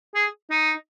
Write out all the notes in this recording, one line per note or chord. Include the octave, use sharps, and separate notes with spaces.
G#4
D#4